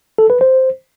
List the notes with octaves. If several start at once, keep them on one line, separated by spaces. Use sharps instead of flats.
A4
B4
C5